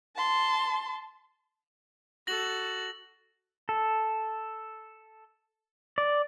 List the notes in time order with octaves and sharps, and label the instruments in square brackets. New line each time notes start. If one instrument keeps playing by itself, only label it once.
[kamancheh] A5 C6
[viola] F#4 A4 [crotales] A#6 F#7
[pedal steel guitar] A4
D5